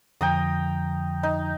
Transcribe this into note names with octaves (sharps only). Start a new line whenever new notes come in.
F2 D3 F3 G5 A#5 D#6
D#4